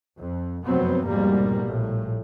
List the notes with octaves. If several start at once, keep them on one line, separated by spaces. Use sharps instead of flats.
F2
F1 F#2 F#3 B3 C4
F1 G#2 B2 G3 A#3
A#1 A2